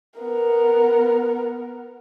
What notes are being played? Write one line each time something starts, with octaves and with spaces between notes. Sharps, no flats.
B3 A#4